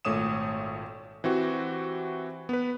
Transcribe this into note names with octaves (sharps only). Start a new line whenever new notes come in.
G#1 A#2 A3 C#5 D#6 E7
E3 C4 F#4 G4
B3 B4